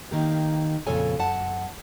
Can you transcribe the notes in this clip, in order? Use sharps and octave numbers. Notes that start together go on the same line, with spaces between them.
D#3 A#3 G4
F2 A#2 C#3 A4 C#5 G#5
F#2 F#5 A5